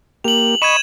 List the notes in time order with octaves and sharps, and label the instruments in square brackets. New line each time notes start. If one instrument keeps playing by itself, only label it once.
[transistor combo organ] A#3 G4 [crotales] F7 F#7
[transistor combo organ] D#5 B5 C#6 [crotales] G#6 D#7 E7